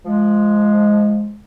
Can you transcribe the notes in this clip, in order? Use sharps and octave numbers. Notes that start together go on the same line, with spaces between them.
F3 G#3